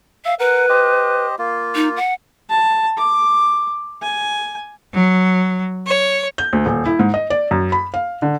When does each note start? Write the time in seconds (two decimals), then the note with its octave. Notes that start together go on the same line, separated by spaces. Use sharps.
0.25 E5 F5
0.39 A#4 B4 F#5
0.69 G4 C5 D#5
1.39 A#3 F4
1.75 D#4
1.96 F#5
2.49 A5
2.97 D6
4.02 G#5
4.94 F#3
5.87 C#5
6.38 G6
6.53 D2
6.66 D#1
6.86 E4
6.99 G#2
7.14 D#5
7.30 D5
7.51 F#2
7.72 B5
7.94 F5
8.22 D3